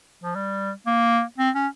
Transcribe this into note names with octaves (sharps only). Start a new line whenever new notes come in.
F3
G3
A#3
C4
C#4